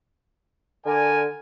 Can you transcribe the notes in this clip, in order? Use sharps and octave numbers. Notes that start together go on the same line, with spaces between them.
D3 A#4 D5 G#5